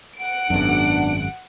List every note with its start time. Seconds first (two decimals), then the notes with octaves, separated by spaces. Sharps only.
0.18 F#5 D7
0.50 G#1 F#2 B3 D4